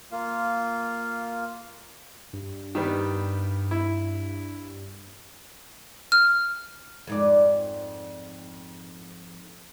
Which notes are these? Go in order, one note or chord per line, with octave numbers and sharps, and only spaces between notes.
A#3 F4 F5
G2
D#3 G3 B3
E4
F6
F2 G#2 D5